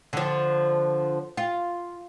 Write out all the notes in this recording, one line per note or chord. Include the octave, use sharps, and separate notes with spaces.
D3 F3
F4